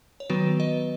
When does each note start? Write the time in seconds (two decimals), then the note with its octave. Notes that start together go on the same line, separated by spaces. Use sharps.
0.20 C#5
0.30 D#3 F#3 B3 F#4 B4
0.60 B4 D#5